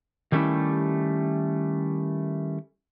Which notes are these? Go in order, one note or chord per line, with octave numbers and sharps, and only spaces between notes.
D#3 G3 A3 C#4 E4 G4